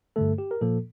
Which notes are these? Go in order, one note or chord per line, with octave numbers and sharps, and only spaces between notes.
G2 D3 A3 A4
G4
A#4
A#2 F3 A#3 A4